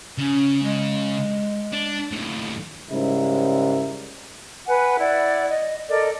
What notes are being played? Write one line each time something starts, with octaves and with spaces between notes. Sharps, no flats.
C#3 C#4
G#3
D4
D#2 A2
G#2 C#3 G3 E4 A#4
B4 F#5 G#5
E4 D5 F#5
D#5
A4 A#4 D5 D#5